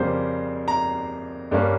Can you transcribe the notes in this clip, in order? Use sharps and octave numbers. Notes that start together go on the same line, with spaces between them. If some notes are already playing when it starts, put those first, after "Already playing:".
Already playing: F2 C#3 G3 A#3 C5
A#5
G2 G3 A#3 C#4